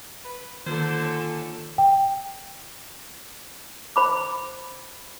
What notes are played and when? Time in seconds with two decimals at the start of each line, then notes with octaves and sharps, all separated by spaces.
0.25 B4
0.66 D3 D#3 A#3 F4 A4 C5
1.05 C#4
1.78 G5
3.96 C5 B5 D6